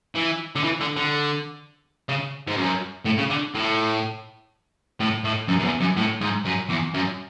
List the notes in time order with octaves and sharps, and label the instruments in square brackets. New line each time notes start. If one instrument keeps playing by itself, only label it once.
[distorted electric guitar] E3
D3
E3
D3
D3
C#3
G#2
F#2
A2
C#3
D3
A2
A2
A2
F#2
F#2
E2
F#2
A2
G#2
F#2
E2
F#2